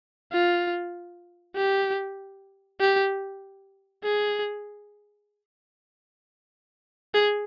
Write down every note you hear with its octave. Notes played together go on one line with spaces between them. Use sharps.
F4
G4
G4
G#4
G#4